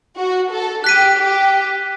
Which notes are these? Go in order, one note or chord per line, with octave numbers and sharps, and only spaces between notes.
F#4
A4
G4 F#6 B6 D#7
G4